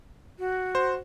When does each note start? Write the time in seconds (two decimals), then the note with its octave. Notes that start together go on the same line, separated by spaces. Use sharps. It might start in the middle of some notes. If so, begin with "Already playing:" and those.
0.39 F#4
0.75 C5